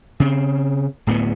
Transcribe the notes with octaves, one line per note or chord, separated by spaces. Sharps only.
C#3 C4
D1 A2 A#3 B3